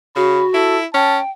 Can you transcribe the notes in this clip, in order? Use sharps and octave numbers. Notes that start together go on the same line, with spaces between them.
C#3 F#4 B5
E4 A4
C#4 G5 A5